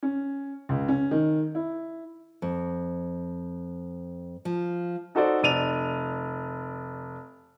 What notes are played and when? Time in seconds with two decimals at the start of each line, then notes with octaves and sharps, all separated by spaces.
0.03 C#4
0.69 C#2
0.88 C#4
1.11 D#3
1.55 E4
2.42 F2
4.45 F3
5.15 D#4 F#4 A4 C5 D5 D#5
5.43 F1 D5 D#7 F7